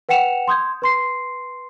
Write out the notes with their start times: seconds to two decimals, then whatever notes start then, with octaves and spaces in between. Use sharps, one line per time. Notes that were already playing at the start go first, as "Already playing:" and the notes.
0.09 B4 F#5 G5 C#7 E7 F7
0.48 C6 D#6 G6 G#6
0.82 B4 C6 C7